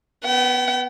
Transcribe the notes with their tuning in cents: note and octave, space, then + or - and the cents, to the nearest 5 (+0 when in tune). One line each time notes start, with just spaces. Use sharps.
B3 +0 G5 -45